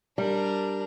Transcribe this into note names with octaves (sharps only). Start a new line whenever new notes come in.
G3 D4 A#4